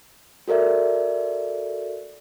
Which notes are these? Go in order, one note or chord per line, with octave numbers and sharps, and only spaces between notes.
F#4 A4 A#4 D5 E5